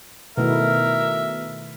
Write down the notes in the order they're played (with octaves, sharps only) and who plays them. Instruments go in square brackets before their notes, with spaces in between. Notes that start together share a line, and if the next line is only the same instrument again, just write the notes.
[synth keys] B2 [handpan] D#3 A3 E4 [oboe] A#4 [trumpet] E5